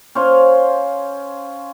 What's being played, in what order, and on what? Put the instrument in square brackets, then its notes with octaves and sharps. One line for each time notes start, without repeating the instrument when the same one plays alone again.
[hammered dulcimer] C#4 C5 F5